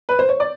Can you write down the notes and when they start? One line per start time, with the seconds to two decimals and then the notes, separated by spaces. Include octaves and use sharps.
0.09 B4
0.19 C5
0.29 C#5
0.40 D5